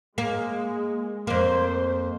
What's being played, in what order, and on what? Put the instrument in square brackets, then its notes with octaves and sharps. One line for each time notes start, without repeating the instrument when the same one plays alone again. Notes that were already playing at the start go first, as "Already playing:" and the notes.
[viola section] G#3 [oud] A#3
[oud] F2 A#3 [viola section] C5